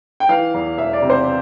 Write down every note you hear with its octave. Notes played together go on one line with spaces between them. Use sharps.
G5
E3 F5
E2
E1 E5
D5
C3
C5